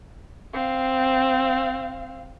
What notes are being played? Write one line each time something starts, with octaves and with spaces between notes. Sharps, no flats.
C4 F5